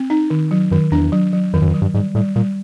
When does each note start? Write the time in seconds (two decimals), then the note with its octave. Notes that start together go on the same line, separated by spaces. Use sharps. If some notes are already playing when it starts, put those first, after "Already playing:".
Already playing: C4
0.10 D#4
0.30 D#3
0.51 F#3
0.71 F#2 D#3
0.92 E2 D4
1.12 F#3
1.33 F#3
1.53 F2 D#3
1.62 F#2
1.67 F2
1.74 F#3
1.82 G2
1.94 G#2 G3
2.15 A2 G3
2.36 A#2 G3